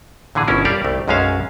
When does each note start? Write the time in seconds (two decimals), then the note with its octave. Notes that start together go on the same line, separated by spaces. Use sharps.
0.35 A#2 D3 E3 G#4
0.48 G1 B2 C#4 E4 A#4
0.65 G3 G4 A#4 C#5 D5 F5
0.85 C2 A3
1.08 B1 F#2 G#3 C#4 F5 A5